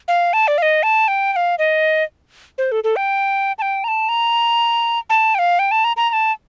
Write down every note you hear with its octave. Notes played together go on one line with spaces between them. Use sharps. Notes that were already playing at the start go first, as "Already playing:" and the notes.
F5
A5
D5
F5
D#5
A5
G5
G5
F5
D#5
C5
A4
A4
G5
A5
G5
A#5
A5
A#5
A5
G5
F5
G5
A5
A#5
A#5
A#5
A5